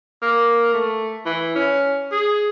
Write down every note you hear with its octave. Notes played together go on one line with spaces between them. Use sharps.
A#3
A3
E3
C#4
G#4